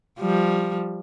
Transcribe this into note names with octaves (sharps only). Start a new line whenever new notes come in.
F3 G3